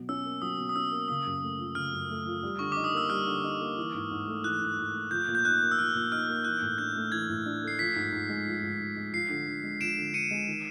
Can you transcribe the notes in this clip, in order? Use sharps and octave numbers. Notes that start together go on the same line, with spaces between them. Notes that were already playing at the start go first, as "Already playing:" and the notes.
Already playing: B2 F#3
C#4 E6
A#3
F#3 D#6
B2
D#6
C#4 E6
A#3
C#3 D#6
F#2
A3
F3
C#3 F6
F#2
A3
F3
G3
D3 C#6
D#4 D6
D#6
A#3 E6
G3 F6
D3
D#4
A#3
E3
G#2
G#2
A3
E3 F#6
G#2
G#2
A3
F3 G6
A#2
G6
D#4 F#6
A#3
E6
F3 F6
A#2
D#4 F6
A#3
E3 F#6
A2
D4 G6
A3
E3 G#6
A2
D4
A3 C7
F3 B6
G#2
G#2
G#3
F3
G#2
G#2
G#3
F3 C7
D3
D3
G#3
F3 D7 E7
D3
D3 C#7 D#7
G#3
D#3